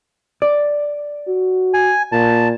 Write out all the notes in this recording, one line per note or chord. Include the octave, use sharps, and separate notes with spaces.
D5
F#4
G#5
A#2 A5